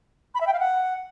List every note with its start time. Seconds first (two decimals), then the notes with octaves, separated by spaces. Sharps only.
0.34 B5
0.40 E5
0.47 G5
0.53 F5
0.59 F#5